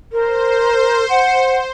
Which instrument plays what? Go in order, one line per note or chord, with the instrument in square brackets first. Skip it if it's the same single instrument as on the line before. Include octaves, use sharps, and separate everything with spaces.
[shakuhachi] A#4 [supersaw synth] C5
[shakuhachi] F#5